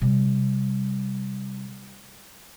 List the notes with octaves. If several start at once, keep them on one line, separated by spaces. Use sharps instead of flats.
C3 G3